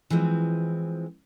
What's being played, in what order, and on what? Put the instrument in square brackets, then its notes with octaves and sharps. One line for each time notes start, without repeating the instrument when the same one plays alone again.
[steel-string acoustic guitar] E3 F3 G#3 C4